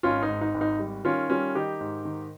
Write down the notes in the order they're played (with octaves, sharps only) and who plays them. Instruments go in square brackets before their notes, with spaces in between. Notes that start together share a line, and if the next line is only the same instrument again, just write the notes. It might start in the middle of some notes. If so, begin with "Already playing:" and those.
[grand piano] G#1 C#4 F4
D#4
G#2
D#4
G#1
D#4
G3
D#3 C#4 F4
G3 C#4 F4
D#3 D#4 G4
G#2
D#3